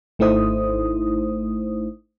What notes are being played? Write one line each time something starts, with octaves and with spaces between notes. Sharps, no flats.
G#1 A3 D#4 E4 C5 D#6